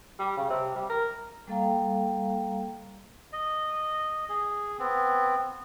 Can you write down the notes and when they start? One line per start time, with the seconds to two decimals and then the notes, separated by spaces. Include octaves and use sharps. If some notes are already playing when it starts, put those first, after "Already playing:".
0.19 G3
0.37 C#3
0.50 C3
0.75 G3
0.90 A#4
1.47 G3 A#3 A4 F5 G5 A#5
3.33 D#5
4.29 G#4
4.79 B3 C4